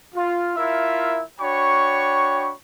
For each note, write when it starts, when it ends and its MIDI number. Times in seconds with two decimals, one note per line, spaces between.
0.15 0.55 65
0.56 1.21 64
0.56 1.21 65
0.56 1.21 70
0.56 1.21 76
1.40 2.52 62
1.40 2.52 66
1.40 2.52 73
1.40 2.52 79
1.40 2.52 83
1.40 2.52 85